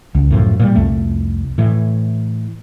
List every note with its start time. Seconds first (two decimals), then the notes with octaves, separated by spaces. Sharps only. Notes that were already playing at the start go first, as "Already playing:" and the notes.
0.15 C#2
0.30 F#2 A2 F3
0.60 A#2 E3 G3
0.75 C2 F2 A3
1.58 A2 E3